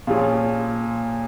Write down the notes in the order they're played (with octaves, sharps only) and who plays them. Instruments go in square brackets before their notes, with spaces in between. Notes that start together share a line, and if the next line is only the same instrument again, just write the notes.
[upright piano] A#2 F3 C#4 F4 G#4